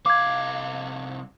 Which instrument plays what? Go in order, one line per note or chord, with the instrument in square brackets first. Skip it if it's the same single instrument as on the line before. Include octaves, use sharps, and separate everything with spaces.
[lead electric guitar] C2 F5 [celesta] D6 G#6